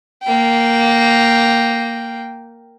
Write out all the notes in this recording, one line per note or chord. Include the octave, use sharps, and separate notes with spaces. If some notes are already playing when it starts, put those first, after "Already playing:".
A#3 G5